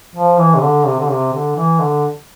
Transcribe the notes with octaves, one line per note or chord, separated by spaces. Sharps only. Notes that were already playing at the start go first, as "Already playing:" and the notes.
F3
E3
C3
D3
C3
D3
C3
D3
E3
D3